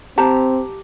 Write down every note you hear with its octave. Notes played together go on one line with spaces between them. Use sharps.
C4 G4 A5 A#5